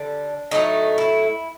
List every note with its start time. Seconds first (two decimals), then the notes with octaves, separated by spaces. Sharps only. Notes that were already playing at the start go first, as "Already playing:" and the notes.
Already playing: D3 G3 D4
0.51 A2 F#3 A3 D#4
0.98 E4